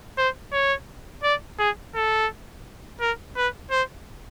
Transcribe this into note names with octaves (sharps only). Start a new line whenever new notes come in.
C5
C#5
D5
G#4
A4
A#4
B4
C5